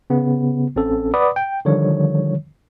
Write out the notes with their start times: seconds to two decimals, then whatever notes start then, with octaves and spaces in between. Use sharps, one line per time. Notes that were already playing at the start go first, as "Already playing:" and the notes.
0.10 C#3 B3
0.76 A1 C4 C#4 A4
1.14 B4 D5 F#5 B5 D6 D#6
1.36 G5
1.65 D3 D#3 F3 G3 C#5